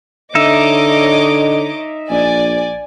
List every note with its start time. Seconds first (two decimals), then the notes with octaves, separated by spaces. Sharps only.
0.35 D3 D#4 C#5 D#5 E5 D6
2.10 A#1 D5 G#5